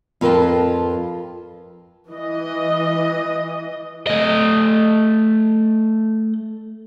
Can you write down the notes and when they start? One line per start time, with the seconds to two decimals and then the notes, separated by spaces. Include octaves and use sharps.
0.21 F2 F4 A#4 B4 G5 A5
2.08 E3 D#5
4.07 A3 D#5